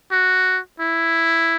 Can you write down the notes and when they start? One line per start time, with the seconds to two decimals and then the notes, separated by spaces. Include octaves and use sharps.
0.12 F#4
0.80 E4